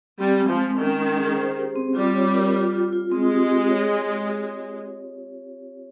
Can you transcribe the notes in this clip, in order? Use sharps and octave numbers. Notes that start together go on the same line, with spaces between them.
G3 C4
G#3
F3
G#3
D#3 C#4
C#4
G#4
C5
G4
C4
G3 F4
C#5
A#4
F4
F4
F4
G#3 C4
G4
G4
C#5